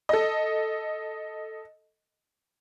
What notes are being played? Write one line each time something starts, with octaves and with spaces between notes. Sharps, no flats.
A4 D#5